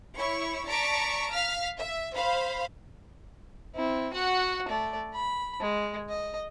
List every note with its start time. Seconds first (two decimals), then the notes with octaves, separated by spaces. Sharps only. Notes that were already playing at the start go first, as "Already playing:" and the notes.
0.18 E4 C#5 B5 C#6
0.68 D5 A5 A#5 C#6 B6 D7
1.32 F5 F6 B6
1.79 E5
2.16 C5 F5 B5
3.75 C4 E4
4.14 F#4 F#5
4.68 A3 D5
5.13 B5
5.61 G#3
6.09 D#5